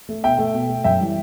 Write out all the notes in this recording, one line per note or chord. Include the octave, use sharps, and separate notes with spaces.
A3
B2 E5 G5
A3
B2
A3
F#2 E5 G5
E3 G3